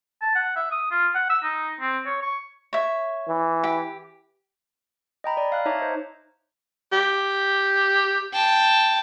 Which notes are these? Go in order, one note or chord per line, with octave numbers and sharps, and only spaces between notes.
A5
F#5
E5
D#6
F4
F#5
E6
D#4
C4
C#5
C#6
C#5 E5
E3
G4
D#5 G5 A#5 B5
D5 A#5
F5 F#6
D#4 C#5 E5 A5 A#5 D6
C5 D#5
G4
G5 A5